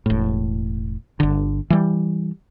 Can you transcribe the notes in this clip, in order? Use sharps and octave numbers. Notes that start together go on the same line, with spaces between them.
E1 A2
G1 D3
E3 G3